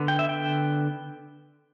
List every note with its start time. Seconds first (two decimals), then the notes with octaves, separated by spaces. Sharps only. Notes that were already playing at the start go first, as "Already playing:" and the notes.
Already playing: D3 B3
0.08 G5
0.19 E5
0.29 G5